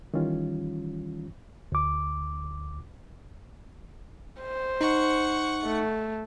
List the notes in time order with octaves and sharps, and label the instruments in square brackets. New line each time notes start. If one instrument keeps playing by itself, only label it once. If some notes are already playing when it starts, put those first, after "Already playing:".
[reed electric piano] D#3 E3 G3 C#4 F4
D2 D6
[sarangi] C5
[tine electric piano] D#4 [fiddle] F#5 C#6
[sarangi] A3